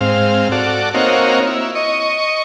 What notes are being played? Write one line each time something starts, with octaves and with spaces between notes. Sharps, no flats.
G#2 C4 F5
F#4 A4 D5
A#3 C4 D#4 F#4 C#5 F5
E4
D#5 C#6